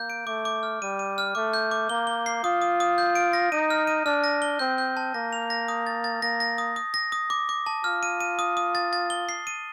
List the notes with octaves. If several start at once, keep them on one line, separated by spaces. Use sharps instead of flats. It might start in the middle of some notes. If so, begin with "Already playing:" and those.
Already playing: A#3 G6
D7
A3 D6
D6
F6
G3 D#7
D#7
F6
A3 D6
G6
D6
A#3 G7
G7
C7
F4 D#6
D#6
D#6
G6
D7
A#6
D#4 D#7
F6
D#7
D4 F6
A#6
G7
C4 G6
G6
A5
A#3 A#6
F7
A#6
D#6
A6
A6
A#3 A#6
A#6
D#6
D#6
A#6
D#6
D6
D6
A5
F4 F6
D#7
D#7
D#6
D#6
A6
A6
G7
C7
D#7